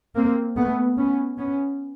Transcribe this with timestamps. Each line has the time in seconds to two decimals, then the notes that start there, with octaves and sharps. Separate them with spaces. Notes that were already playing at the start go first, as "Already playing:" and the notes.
0.15 A#3 C4
0.56 A3 B3
0.97 B3 C#4
1.38 B3 C#4